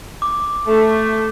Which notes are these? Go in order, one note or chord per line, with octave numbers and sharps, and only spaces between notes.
D6
A3